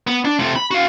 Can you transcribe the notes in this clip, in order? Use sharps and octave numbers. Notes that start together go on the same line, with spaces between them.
B3
D4
C3 A3
B5
F#4 F5